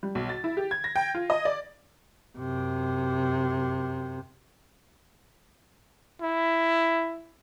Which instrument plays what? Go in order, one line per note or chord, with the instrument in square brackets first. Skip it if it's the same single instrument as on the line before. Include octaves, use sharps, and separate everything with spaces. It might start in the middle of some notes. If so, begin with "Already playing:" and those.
[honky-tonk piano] G3
B1
A6
E4
G4
G#6
A#6
G5
F4
D#5
D5
[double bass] F#2 C3
[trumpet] E4